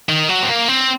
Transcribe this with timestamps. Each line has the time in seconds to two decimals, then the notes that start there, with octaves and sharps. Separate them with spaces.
0.09 D#3
0.29 F#3
0.43 C4
0.49 A#3
0.68 C4